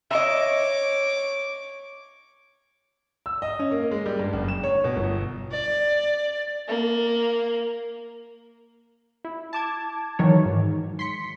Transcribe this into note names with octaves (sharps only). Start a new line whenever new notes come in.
C#5 D#5 E5 D6
E6
D#5
C#4
A#3
G#3
G3
G2
F#1
E7
C#5
B2
G1
D5
A#3
E4
A5 D6 G#6
D#3 E3 F#3 C#5
G#2
C6 B6 C#7